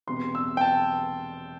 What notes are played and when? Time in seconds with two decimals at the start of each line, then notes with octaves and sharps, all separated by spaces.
0.07 E1 E2 C3 C6
0.35 E6
0.57 G5
0.61 A5